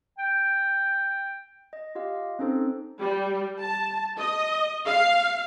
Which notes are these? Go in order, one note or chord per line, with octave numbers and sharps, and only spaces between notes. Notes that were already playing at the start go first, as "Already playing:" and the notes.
G5
D#5
F4 G4 D#5 F5
C4 C#4 D#4 A4 C5
G3
A5
D#5
F5